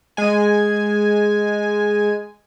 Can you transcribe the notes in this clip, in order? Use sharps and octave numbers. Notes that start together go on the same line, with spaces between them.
G#3 G#5